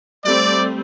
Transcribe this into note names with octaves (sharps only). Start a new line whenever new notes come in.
G3 A3 C4 D5